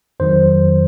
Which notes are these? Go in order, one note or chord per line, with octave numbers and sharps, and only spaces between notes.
F2 D#3 F#3 C5